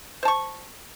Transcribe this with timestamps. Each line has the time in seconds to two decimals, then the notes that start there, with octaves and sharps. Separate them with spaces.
0.23 C5
0.25 A5
0.28 C#6